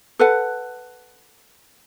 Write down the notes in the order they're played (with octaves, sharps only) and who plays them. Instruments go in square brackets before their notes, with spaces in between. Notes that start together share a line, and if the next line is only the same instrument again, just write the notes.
[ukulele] A4 B4 F#5